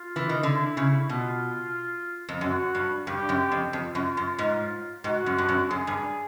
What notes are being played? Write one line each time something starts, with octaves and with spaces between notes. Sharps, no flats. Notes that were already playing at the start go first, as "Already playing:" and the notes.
Already playing: F4
E3
D#3
D3 E4
C#3
B2 F4
F2
F#2 F#4
G2
G2 G4
F#2
F2
F2 F4
F#2
F#2
G#2
G#2 F#4
F#2
G2
F#2
F#2 G#4
G2